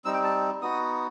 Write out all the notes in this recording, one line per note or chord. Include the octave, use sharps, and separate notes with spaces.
G3 C4 D#4 E6
G5
A5
B3 D#4 F#4 D#6